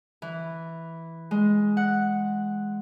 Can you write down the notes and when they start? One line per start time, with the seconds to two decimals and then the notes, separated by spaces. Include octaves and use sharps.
0.22 E3
1.31 G#3
1.77 F#5